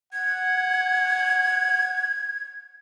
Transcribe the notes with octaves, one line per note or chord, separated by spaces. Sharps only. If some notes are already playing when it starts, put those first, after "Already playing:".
F#5 G#6